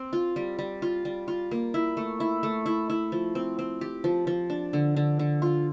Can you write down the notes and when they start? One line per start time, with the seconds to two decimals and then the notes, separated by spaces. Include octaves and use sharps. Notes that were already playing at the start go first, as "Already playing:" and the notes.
Already playing: C4
0.13 F4
0.36 G3
0.59 G3
0.82 F4
1.05 G3
1.28 F4
1.51 A#3
1.74 E4
1.97 A3
2.20 E4
2.43 A3
2.66 E4
2.90 E4
3.12 F3
3.35 C4
3.59 C4
3.81 G4
4.04 F3
4.27 F3
4.50 D4
4.73 D3
4.96 D3
5.19 D3
5.42 F4